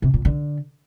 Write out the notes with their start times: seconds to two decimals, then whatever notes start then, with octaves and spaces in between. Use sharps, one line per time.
0.02 C3
0.14 A#2
0.25 D3